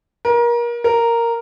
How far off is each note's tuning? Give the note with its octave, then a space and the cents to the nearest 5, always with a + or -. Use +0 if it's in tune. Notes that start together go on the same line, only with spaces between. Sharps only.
A#4 +30
A#4 -5